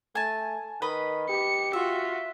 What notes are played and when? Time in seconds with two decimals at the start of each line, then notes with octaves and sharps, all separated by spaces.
0.15 A3 G#5 A5
0.82 D#3 B4 D#5 B5
1.29 G4 C#7
1.73 F4 F#4 E5